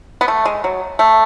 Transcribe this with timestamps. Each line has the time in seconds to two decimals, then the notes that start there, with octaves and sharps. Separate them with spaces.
0.21 B3
0.28 A3
0.45 G#3
0.64 F#3
0.99 A3